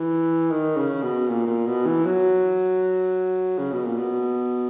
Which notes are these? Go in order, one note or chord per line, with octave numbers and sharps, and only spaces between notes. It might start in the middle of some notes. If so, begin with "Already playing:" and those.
Already playing: E3
D#3
C#3
B2
A#2
A#2
B2
E3
F#3
C#3
B2
A#2
B2